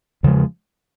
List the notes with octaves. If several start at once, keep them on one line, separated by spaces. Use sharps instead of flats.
E2 C#3 F3 G#3